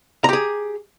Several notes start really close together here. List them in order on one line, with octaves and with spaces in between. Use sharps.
A#5 G4 G#4